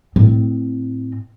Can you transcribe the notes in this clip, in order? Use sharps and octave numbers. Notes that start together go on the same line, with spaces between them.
A2 C4